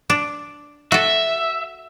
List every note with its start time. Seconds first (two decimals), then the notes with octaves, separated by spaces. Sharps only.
0.10 D4
0.92 F#4 A4 E5